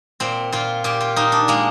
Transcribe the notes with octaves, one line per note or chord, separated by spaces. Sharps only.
A#2 C4
A#2 F4
A#2 G4
F4
A#2 D#4
D4
G#3 A#3